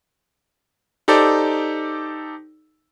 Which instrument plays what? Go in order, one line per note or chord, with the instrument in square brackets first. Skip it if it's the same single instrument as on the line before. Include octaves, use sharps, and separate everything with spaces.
[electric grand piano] D#4 G4 A4 C5 D5